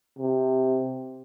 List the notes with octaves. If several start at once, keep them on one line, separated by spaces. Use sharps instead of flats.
C3